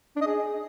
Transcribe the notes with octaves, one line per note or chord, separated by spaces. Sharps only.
D4
D#5
G#4